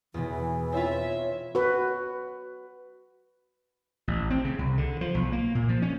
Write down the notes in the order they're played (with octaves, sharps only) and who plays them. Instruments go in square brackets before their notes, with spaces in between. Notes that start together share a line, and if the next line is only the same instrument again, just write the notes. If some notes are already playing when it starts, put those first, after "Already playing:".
[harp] E2 B2 [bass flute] E3
[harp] C4 E4 F4 [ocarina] C#5 [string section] E5
[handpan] F#4 B4
[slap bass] A1
C4
C#3
C2
D3
F3
B1
A#3
A#2
F3
C#4